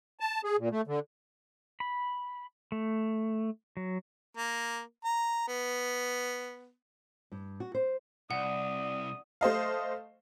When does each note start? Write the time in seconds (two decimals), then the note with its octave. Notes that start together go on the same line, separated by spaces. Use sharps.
0.20 A5
0.44 G#4
0.58 A#2
0.71 A3
0.87 D3
1.80 B5
2.72 A3
3.77 F#3
4.37 A#3
5.04 A#5
5.48 B3
7.32 G2
7.60 F#4
7.75 C5
8.31 C2 D5 F#5 D#6
9.41 A3 C5 D#5 F5